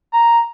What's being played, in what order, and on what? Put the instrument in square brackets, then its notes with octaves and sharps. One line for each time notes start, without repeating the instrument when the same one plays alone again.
[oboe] A#5